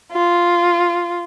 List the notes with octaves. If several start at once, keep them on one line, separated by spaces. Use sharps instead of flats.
F4